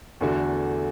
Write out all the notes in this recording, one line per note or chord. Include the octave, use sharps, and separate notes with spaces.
E2 D3 A3 F#4